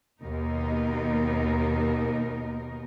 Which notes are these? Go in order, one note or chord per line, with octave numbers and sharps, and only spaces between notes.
D#2 B2 D#4 A#4